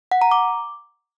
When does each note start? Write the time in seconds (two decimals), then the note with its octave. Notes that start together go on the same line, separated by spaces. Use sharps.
0.12 F#5
0.21 A#5
0.31 D6